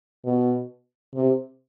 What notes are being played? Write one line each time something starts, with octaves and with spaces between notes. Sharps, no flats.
B2
C3